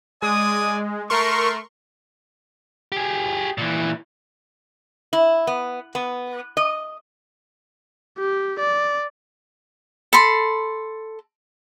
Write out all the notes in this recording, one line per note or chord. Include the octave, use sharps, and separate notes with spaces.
G#3 D5 G#5 D#6
A3 A#4 C6 C#6
G4 G#4
A#2 E3
E4
B3
B3
D#5
G4
D5
A4 B5 C6